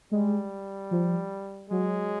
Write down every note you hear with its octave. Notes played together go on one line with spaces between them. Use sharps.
G3 G#3
F3
F#3 G#3